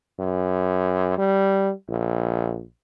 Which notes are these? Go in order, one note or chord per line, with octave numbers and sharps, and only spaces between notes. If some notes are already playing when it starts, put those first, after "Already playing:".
F#2
G3
A#1